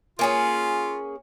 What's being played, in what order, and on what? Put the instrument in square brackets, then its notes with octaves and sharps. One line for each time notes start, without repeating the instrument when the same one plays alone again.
[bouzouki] A#3 C#4 G#4 [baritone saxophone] F4